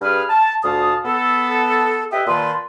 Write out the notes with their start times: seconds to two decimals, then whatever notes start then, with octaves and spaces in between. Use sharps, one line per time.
0.02 G2 G#4 B4 F6
0.30 A5
0.63 D2 A#2 F5 A5 D#6
1.05 B3 A4
2.12 G4 B4 D#5 E5
2.27 A#2 D#3 B4 A5 C6